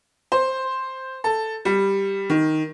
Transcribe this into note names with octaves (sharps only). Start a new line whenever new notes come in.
C5
A4
G3
D#3